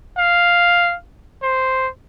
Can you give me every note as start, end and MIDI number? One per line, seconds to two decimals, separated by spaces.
0.18 0.95 77
1.43 1.88 72